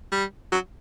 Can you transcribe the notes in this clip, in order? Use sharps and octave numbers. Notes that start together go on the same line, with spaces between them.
G3
F#3